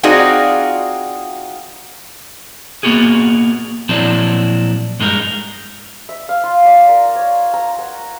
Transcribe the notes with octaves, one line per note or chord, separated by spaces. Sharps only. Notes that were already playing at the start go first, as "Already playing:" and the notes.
C4 D#4 F4 F#4 G#4 D5
A#3 B3 F4 F#4 G#4
A#2 F3 F#3 C4 D4 E4
G2 G#3 D#4 G4 A#4
E5
F5
F4
D5
A#4
C#5
A#5
F#5